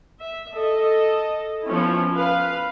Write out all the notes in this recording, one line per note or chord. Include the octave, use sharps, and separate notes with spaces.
E5
A4 D#5
F3 B3 C#4 E4
B4 F5